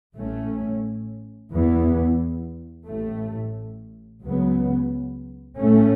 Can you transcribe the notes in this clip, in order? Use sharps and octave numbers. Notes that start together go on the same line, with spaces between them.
A1 A2 A3 C#4
E2 E3 B3
A1 A2 A3
C#2 C#3 F#3 B3
A2 A3 C#4